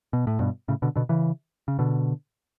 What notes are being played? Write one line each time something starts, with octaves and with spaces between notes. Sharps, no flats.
B2
A2
G2 B2
A2 C#3
B2 D3
B2 D3
C#3 E3
C#3
B2 D3